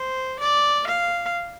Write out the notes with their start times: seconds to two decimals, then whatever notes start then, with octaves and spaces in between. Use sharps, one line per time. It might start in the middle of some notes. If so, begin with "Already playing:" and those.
Already playing: C5
0.40 D5
0.87 F5